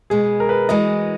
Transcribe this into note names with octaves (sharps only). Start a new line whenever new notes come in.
B2 G#3 B3 G#4
A#4
B4
E3 G#3 B3 F#4 D#5